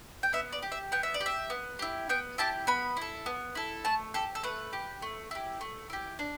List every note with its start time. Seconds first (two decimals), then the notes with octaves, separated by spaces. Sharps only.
0.23 G5
0.33 B3 E5
0.52 D5
0.62 G4
0.72 E5
0.92 B3 G5
1.03 E5
1.14 D5
1.21 G4
1.26 E5
1.50 B3
1.79 E4 G4
2.09 B3 G5
2.38 E4 G4 A5
2.67 B3 B5
2.97 E4 A4
3.26 B3
3.55 E4 A4
3.85 A3 A5
4.14 G4 A4
4.35 A4
4.43 A3 B4
4.73 G4
5.02 A3
5.31 E4 G4
5.61 A3
5.90 E4 G4
6.19 D4